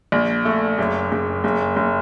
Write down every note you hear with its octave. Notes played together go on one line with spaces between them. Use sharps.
A#1
A3
F#1
F#1
F#1
F#1